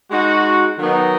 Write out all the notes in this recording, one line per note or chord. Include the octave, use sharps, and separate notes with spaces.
G#3 D#4 F#4
D#3 F#3 B3 D#4